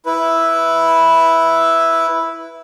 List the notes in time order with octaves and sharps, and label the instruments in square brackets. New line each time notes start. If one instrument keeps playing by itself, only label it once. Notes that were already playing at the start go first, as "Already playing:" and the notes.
[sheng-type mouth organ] E4 B4